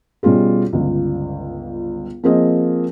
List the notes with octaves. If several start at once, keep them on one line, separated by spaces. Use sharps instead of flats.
B2 G3 C#4 F4 G#4
G1 C#2
F3 A#3 C4 G#4 C5 D#5